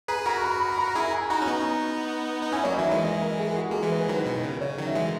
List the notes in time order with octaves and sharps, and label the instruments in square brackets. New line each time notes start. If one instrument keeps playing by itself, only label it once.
[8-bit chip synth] G#4 B4 [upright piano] A#5
[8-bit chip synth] F#4 A#4 [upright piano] A#5
[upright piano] C#6
B5
B5
A#5
[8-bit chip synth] E4 G#4 [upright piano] A#5
[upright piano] G#5
[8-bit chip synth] D#4 F#4 [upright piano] A#5
[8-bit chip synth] C#4
B3 D#4
D#4
[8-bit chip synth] C#4 E4 [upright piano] G#5
[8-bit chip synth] F#3 A#3 [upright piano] C#5
[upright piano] D#5
[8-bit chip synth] D#3 F#3 [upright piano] E5
[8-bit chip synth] E3 G#3
[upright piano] D#5
A#4
G#4
F#4
[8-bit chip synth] A#3 [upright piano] G#4
[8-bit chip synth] E3 G#3
[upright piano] B4
[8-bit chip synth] D#3 F#3 [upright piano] B4
[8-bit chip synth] B2 D#3
C#3
[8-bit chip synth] C#3 [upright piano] C#5
[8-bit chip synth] D#3 F#3
[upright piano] E5
[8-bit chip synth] E3 G#3